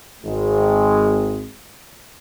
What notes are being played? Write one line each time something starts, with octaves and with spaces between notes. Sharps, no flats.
G#1 G#3